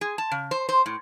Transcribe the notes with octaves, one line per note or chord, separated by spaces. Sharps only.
G#4
A5
C#3
C5
C5
A2